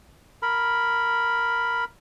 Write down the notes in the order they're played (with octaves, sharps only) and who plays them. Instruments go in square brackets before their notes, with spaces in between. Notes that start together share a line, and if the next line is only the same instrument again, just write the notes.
[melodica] A#4 B5